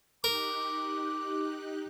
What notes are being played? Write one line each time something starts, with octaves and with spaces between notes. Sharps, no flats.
D#4 G4 A#4 D6 F#6